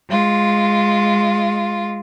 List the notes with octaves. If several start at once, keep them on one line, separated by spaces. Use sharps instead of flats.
G#3 F4